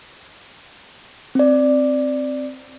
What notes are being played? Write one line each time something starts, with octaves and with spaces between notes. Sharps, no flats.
C4 D5